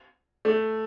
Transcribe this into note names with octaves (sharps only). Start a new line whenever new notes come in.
A3